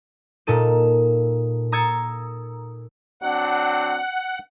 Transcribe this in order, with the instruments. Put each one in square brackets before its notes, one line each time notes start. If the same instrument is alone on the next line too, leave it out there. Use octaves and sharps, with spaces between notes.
[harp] A#2 D#4 A4 D#7
A#5 D#6 E6 G#6 A6 C#7
[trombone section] F#3 C4 D4 [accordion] F#5